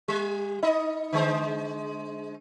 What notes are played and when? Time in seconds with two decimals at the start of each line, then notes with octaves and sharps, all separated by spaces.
0.08 G3
0.63 D#4 D#5
1.12 D3 G#3 C5